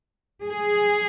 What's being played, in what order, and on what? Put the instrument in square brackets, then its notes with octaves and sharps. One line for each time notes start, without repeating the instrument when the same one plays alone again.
[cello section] G#4